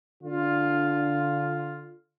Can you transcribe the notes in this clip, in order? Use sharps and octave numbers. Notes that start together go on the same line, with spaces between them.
D3 F4